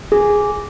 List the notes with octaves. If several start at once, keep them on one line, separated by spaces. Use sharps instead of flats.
G#4